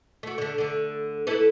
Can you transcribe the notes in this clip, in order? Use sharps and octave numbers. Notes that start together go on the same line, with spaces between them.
A3 F#4
D3 A3
D3 A3
E4 A4 B4